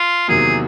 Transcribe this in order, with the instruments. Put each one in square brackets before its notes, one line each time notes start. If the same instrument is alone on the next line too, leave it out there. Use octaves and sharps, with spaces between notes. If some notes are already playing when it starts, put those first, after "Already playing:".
Already playing: [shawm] F4
[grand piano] E2 C3 D#3 F#3 A#3 [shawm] G#4